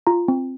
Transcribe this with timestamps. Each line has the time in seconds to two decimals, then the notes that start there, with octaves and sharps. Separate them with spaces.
0.07 F4 A#5
0.28 C4